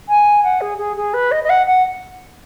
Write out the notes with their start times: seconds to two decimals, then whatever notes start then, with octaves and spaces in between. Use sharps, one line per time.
0.08 G#5
0.43 F#5
0.61 G#4
0.78 G#4
0.96 G#4
1.13 B4
1.31 D#5
1.43 D#5
1.49 F#5
1.66 F#5